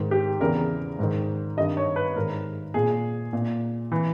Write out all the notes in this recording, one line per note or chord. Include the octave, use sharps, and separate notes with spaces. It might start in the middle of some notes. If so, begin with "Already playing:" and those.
Already playing: G#2 D#3
G4
E2 C#3 E3 A#4
G#2 D#3
G2 D#3 D#5
C#5
B4
G#2 D#3 A#4
A#2 G#4
A#2
E3